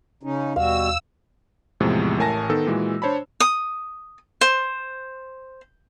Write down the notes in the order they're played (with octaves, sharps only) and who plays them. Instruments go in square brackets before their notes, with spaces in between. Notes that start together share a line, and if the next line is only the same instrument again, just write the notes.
[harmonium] C#3 C#4 D#4
[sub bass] D#2 [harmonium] B2 G3 F#4 [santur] F5 [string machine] E6
[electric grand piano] E2 A2 C3 F3 G#3
A1 A2 A#4 G#5 A5 A#6
D#3 B3 A4 E6
A#2 E3 G#3 F#4
D4 C5 C#5 A5 B5
[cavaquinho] D#6
C5